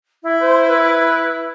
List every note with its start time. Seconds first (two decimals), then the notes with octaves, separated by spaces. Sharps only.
0.23 E4
0.42 C5
0.69 B4